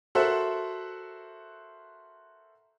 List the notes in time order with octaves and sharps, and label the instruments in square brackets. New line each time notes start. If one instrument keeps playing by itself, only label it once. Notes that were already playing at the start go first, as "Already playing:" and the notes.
[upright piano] F#4 A4 A#4 C5 E5 F#5